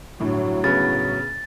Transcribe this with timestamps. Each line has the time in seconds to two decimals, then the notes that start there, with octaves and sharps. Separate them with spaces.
0.20 G1 A2 F#3
0.64 C#3 B3 A6